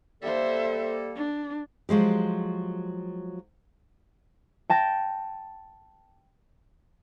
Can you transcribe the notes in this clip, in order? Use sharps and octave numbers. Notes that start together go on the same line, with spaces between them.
G3 A#3 A4 C5 E5
D4
F3 F#3 G#3 G4
G5 A5 A#6